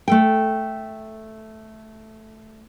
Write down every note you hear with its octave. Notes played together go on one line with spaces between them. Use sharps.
A3 A4 G5